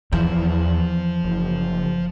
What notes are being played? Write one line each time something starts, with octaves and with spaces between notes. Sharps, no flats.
E2 E3 F3 F5
F#1